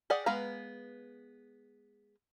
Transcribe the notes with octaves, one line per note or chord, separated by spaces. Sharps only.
G4 G#4 D5 F#5
G#3 B3 B4 F5 A#5